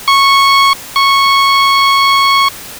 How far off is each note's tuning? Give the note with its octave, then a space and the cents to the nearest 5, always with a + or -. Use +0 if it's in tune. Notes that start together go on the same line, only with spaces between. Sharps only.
C#6 -10
C#6 -10